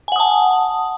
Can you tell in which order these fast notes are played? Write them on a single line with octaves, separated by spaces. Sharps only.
G#5 F#5 D#6 A5